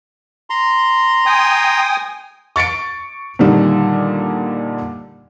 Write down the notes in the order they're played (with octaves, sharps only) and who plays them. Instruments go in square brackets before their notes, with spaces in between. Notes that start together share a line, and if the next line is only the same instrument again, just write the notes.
[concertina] A#5 C6
[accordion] G5 G#5 D#6
[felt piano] C#6 A6 C#7 D7
A#2 D3 D#3 G3